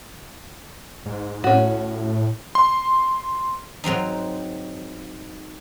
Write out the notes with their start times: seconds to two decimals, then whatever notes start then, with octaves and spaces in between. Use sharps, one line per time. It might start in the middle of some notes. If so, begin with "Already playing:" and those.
1.06 G#2
1.44 A2 C#4 F#4
2.55 C6
3.84 G#2 F#3 C4 D#4